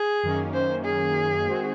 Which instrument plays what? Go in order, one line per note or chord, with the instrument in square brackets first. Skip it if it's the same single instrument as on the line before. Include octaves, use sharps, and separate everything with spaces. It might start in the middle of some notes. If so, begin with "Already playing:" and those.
Already playing: [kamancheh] G#4
[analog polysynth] F#2 D#3 A#3 C#4
[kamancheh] C5
G#4
[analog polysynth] D#3 G#3 C4 F#4 C5